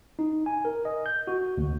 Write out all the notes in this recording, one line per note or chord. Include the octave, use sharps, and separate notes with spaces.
D#4
G#5
A#4
D#5
G6
F#4
D2